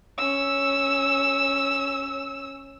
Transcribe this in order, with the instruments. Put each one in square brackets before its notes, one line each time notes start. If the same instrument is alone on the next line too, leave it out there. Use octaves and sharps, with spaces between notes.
[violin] C#4 E6